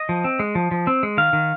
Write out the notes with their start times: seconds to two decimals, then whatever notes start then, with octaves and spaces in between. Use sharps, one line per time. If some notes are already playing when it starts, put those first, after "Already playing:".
Already playing: D#5
0.09 F3
0.24 C4
0.40 G#3
0.55 F3
0.71 F3
0.87 C4
1.03 G#3
1.17 D#3 F5
1.33 D#3